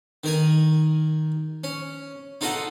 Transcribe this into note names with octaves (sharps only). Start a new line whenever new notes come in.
D#3 A#4 G#5
C#4
D#4 F4 A4 D#5 F#5